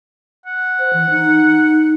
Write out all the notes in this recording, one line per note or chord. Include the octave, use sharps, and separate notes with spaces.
F#5
C5
E3
D#4